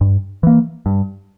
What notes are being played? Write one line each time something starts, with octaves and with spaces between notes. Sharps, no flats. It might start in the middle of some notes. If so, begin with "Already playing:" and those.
G2
E3 A#3
G2